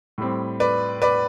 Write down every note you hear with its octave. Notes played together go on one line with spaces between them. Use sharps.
A2 G3 C4
B4 D5
B4 D5